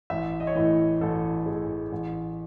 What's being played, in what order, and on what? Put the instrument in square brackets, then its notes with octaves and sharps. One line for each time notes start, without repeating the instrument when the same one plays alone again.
[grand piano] A1 E5
D#5
C#5
A2 E3 D#5
A1 A4
A2 E3 G#4
A1